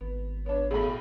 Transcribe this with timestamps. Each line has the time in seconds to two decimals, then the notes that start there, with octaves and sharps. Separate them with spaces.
0.01 G#1 B3
0.46 B3 D4 C#5
0.71 B1 A2 B3 G#4 A4 B5